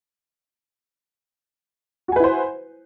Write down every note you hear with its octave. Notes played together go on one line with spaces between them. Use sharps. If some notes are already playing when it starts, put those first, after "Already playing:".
E4 F#4 B4 C5 G#5